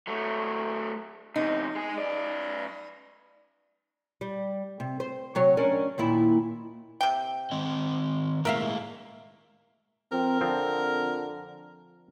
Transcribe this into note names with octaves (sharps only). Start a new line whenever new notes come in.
F#3 A3
E2 C3 D#4
G#3 G#4
F#2 D5
G3
C3
C5
C3 F#3 C#5
C#4 D4 A#4
D#2 A#2 E4
C3 G5
D#3 C4 D#5
A2 G#3 A#3 A#4 E5 F5
F2 C4 A#4
D3 F3 C4